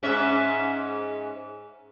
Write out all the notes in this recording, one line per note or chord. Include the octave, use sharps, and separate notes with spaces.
G#2 C#4 E5